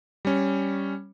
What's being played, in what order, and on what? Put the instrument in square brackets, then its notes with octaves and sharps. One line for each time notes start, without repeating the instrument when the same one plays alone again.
[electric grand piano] G3 C#4